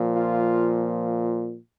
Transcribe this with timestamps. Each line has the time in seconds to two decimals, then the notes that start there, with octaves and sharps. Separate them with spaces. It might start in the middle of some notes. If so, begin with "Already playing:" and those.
Already playing: A#2 F3
0.14 F4